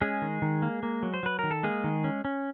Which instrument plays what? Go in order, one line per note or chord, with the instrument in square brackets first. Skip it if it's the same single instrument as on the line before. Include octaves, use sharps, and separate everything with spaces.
[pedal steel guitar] G#3 C#4 G#4
D#3
D#3
A#3
A#3
F#3
C5
F#3 B4
D#3 A#4
A4
G#3 A#3 G#4
D#3
C#4
C#4